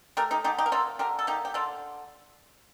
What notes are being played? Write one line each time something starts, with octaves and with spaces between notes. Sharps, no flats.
A3 G4 A#4
D#4 G4
D3 D#4 G4
D#4 G4
A#4
A#3 F4 A4
D3 G4 A#4
A4
A#3 D#4 G4
G4
D3 F4 A4